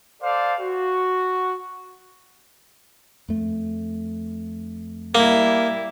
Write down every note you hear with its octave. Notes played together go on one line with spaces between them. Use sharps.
A4 C5 D5 F5
F#4
F2 A3
G3 A#3 E4